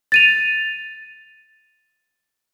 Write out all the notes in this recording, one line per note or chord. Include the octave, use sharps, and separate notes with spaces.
A6 D#7 F7